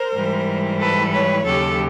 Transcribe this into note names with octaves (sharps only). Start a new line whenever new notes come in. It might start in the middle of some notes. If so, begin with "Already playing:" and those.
Already playing: A#4 C5
G#2 E3 G3
A4 B4
B4 C#5
D#2 C#3 F#3 G4 A4